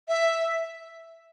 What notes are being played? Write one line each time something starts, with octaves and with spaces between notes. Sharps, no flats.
E5